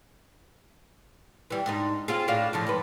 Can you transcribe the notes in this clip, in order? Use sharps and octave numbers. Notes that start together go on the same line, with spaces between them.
E3 G3
G#2 D4 D#4
C4 F4 G#4
A2 D4 F5
A2 D3 F3
F2 G#2 B4